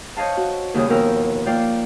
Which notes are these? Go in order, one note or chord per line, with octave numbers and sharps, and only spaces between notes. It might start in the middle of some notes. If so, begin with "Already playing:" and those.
C5 C#5 D#5 F5 A5
F#4
D#2 C#3 G3 G#4 D#6
D#2 B2 F3 A#4 G5 E6
A#3 F4 D5 F5 G5